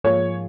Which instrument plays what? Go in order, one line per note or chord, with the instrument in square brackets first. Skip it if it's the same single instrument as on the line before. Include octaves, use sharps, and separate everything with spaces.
[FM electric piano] G#2 F3 A#3 F4 G#4 [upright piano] C#5